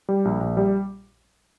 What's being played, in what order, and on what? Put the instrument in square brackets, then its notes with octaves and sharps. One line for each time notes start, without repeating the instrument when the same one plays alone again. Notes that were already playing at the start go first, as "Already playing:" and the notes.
[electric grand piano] G3
A#1
A#1
G3